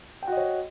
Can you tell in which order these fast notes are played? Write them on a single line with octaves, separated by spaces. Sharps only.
G5 F#4 D#5 C#5